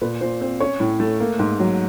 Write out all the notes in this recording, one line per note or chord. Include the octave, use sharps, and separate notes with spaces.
A#2 B4
A#2 C5
C4 C5
C#4 C#5
A2
A3
A#3
G#2
F#3